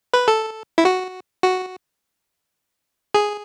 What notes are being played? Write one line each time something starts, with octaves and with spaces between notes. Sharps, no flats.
B4
A4
E4
F#4
F#4
G#4